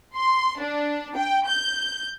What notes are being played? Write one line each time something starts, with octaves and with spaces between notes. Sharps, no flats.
C6
D4
G5
G6